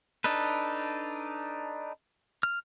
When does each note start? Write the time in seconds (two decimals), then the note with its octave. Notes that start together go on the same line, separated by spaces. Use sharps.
0.24 D4 D#4 A4 B4
2.43 F6